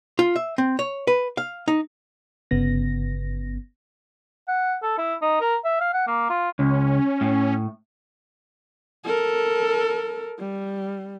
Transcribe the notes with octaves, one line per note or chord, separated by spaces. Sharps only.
F4
E5
C4
C#5
B4
F5
D#4
G1 C#3 B3 A#6
F#5
A4
E4
D#4
A#4
E5
F5
F#5
A#3
F4
C#2 C#4
A2
A4 A#4
G3